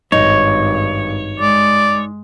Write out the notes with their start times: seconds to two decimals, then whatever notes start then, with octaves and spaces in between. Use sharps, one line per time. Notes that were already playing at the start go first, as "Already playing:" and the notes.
0.12 G#1 G2 D#4 C#5
1.40 G#3 D5